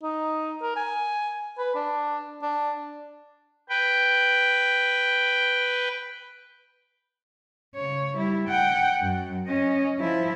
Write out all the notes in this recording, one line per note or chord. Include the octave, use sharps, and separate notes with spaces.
D#4
A#4
G#5
B4
D4
D4
B4 G5
C#3 C#5
G3 E4
F#5 G5
F#2
C#4 D#5
F3 E4